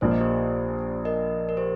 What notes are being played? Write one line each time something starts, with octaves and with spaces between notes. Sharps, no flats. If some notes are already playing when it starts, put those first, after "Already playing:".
A#1 A#2 F3 A#3 C5
D#5
G4 C5
A#4 D#5
A#4
G4 C5